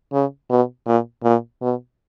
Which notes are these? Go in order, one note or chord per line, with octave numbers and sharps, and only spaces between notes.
C#3
B2
A#2
A#2
B2